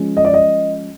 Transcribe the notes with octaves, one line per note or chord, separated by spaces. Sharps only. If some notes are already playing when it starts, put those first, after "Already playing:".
Already playing: F3 G#3 C#4
D#5
D5
D#5